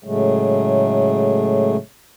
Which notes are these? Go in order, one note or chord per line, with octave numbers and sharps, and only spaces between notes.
A2 C#3 F#3 G#3 A3